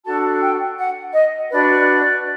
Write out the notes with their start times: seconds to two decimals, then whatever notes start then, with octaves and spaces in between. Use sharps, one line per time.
0.05 D4 F#4 A4 A5
0.41 G5
0.77 F#5
1.13 D#5
1.49 D4 F#4 B4 D5